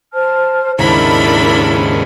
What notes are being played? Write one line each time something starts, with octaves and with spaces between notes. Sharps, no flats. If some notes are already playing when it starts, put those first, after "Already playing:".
C5 A5 F6
D#2 G#2 C#3 D4 E4 A#4 B5